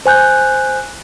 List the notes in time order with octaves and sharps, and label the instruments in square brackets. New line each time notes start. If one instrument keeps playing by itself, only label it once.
[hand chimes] C5 G#5 F#6 G6